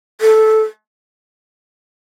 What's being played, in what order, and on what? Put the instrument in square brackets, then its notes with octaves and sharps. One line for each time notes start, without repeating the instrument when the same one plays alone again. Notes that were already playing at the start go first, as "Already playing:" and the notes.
[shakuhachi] A4